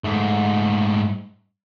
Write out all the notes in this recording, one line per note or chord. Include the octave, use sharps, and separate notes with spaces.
G#2 A3